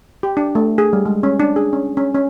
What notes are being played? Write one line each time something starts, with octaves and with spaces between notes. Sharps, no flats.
G4
D4
A3
G#4
G3
G#3
C#4
D4
G#4
C#4
C#4
C#4